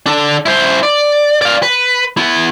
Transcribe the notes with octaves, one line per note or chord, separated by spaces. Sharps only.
D4 A4
E4 C5
D5
D5 F5
B4
B3 E4